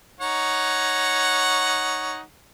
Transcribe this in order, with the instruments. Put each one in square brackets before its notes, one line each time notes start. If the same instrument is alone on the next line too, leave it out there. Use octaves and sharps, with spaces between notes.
[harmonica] D#4 C#5 F#5